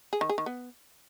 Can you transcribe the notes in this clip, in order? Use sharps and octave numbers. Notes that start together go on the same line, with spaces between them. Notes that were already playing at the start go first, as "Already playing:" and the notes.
G#4
D#3
G#4
D#3
B3